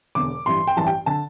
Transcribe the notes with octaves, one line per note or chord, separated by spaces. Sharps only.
E1 E2 D3 D6
A1 G2 E3 C6
G5
A1 G2 E3 A5
G5
D3 A5